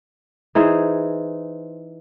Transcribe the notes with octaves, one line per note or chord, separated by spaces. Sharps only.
E3 D#4 G#4 C5